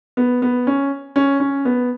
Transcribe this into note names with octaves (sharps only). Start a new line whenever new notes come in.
B3
B3
C#4
C#4
C#4
B3